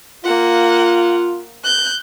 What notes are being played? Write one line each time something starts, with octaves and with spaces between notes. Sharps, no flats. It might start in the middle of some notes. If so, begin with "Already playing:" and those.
A#3 F4 F#5
F#6 G6